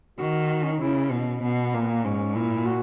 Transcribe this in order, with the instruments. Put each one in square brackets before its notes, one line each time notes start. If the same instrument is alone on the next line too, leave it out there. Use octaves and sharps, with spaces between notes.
[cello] D#3 [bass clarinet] F#4
[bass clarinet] C#4
D#4
[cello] C#3 [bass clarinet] E4
[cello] B2
[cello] B2 [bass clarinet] B3
[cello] A#2 [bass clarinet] A#3
[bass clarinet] B3
A#3
[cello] G#2 [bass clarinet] C#4
[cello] A#2 [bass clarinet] E4
[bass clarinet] F#4